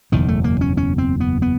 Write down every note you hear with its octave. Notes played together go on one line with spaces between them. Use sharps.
F#1 E2 B2 D#3
A3
A#3
C#4
C#4
C4
B3
B3